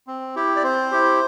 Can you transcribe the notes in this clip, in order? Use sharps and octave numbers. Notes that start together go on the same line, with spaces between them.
C4
E4 G4
D5
C4 C5
E4 G4